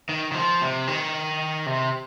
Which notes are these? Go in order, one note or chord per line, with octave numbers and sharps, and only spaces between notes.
D#3
D#3
F3
C3
D#3
C3